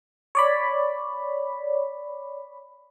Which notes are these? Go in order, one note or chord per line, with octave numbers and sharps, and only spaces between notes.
C#5 D5 B5